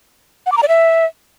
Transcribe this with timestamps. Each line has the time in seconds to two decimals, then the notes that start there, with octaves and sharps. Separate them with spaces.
0.46 F#5
0.52 D6
0.57 A#5
0.63 D5
0.68 E5